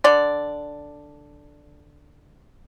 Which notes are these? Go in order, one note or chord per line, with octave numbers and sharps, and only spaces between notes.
D3 D5